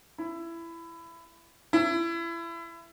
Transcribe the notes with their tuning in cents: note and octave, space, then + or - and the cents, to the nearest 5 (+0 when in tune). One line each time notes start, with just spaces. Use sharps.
E4 +20
E4 +30